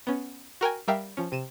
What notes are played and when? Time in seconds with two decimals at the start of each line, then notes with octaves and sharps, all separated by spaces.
0.07 B3 C#4
0.61 F#4 A#4 G5 G#5
0.88 G3 A#4 E5 F5 G5
1.17 F3 C#4
1.32 C3 D#7 E7